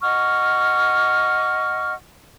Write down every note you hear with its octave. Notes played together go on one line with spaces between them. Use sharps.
D#5 F#5 C#6 F6